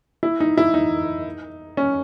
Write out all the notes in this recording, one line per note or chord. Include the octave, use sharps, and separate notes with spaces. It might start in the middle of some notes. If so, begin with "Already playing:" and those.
E4
D#4
E4
D#4
C#4